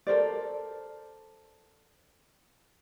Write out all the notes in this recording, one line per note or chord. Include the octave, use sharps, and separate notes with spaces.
A4 A#4 C5 D5